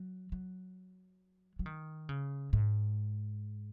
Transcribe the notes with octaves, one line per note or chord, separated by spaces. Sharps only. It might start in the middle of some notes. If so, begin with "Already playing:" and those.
Already playing: F#3
F#3
F#3
D#3
C#3
G#2